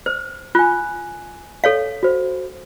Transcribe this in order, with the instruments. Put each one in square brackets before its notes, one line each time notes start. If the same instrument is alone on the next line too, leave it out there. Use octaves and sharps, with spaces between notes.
[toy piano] C5 [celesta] F6
[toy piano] F4 [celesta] G#5 F#6
[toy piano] A4 C#5 F5
[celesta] F#4 C5